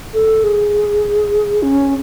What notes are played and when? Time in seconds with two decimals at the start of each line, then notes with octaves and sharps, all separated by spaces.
0.14 A4
0.44 G#4
1.63 C#4